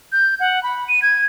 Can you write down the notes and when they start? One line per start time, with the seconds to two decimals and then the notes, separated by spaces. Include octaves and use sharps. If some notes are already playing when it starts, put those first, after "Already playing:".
0.12 G6
0.40 F#5
0.63 B5
0.88 D#7
1.02 G#6